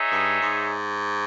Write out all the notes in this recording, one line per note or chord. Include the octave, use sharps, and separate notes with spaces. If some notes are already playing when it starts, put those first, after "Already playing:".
Already playing: D#4 G#4 C#5 E5
G2
G#2